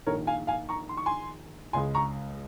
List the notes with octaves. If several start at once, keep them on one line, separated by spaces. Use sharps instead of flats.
A#1 G#2 D#3 A#4 C#5
F5 G#5
F5 G#5
A#5 C#6
C6
C#6
G#5 C6
C#2 C#3 G#3 G#5 C6
A#5 C#6